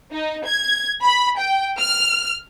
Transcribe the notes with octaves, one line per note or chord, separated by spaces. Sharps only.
D#4
G#6
B5
G5
F6